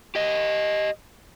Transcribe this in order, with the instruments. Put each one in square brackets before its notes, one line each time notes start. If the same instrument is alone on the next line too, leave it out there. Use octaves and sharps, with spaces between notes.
[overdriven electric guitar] G4 D#5